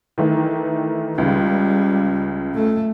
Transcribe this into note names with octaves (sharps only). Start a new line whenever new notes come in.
D#3 E3 A3
C#2 C#3 G3
A3